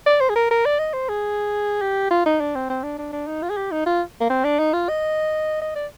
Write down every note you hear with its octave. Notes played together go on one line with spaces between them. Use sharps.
D5
C5
G#4
A#4
A#4
D5
D#5
C5
G#4
G4
F4
D#4
D4
C4
C4
D4
D4
D4
D#4
F4
G#4
G4
D#4
F4
A#3
C4
D4
D#4
F4
D#5
D#5
D5